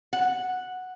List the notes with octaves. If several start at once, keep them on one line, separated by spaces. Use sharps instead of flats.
F#5